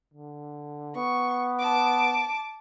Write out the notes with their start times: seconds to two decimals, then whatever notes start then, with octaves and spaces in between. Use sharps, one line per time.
0.13 D3
0.96 B3 C#6
1.59 A5 D6